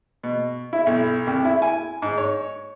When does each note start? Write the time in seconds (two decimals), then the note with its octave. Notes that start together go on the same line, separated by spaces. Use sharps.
0.23 B2
0.73 E4
0.86 B1
1.27 C2
1.45 E4
1.62 G#5
2.02 G#2
2.18 C#5